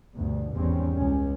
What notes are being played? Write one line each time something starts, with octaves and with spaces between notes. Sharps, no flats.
D2 G2 B2
G#1 E2 G3 C4 C#4
C#2 C#4